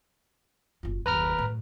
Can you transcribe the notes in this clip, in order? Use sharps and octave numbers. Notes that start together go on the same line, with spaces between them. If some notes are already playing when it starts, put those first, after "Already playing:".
F#1 F4
F#1 D#2 B4 A#5 F6
F#2 A2